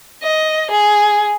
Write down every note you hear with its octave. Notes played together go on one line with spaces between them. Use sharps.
D#5
G#4